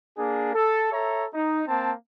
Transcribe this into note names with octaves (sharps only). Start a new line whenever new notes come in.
A#3 D4 G#4
A4
A4 C#5 E5 A#5
D#4
A#3 C4 A5